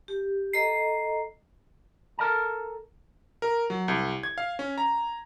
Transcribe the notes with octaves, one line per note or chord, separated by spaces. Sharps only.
G4
A4 D#5 A#5 C7
A4 A#4 D#5 A5 A#5
A#4
F#3
C2
G#6
F5
C#4
A#5